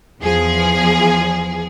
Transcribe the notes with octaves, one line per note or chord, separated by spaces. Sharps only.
E2 F3 G#4